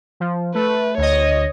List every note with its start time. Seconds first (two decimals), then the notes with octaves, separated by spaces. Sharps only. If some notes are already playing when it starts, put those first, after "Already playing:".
0.20 F3
0.55 A3 B4
0.98 D2 C#5 D#5